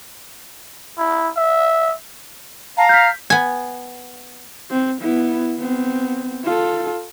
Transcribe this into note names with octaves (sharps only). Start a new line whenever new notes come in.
E4
E5
F5 A5 A#5
F6 G6 B6
B3 G#5
C4
B3 E4
B3 C4
F4 A4